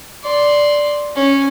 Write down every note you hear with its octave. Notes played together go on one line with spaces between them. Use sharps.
D5 C6
C#4